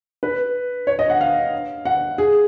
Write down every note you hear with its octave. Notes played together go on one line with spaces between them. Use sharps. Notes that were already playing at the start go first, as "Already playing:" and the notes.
B4
C#5
D#5
F#5
F5
F#5
G#4